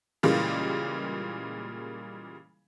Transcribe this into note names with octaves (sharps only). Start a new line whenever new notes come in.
A#2 C#3 E3 G3 G#3 A#3